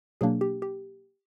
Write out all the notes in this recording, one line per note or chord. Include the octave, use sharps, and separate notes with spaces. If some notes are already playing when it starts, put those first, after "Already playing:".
B2 F#3 A#3 D4 G#4
G4
G4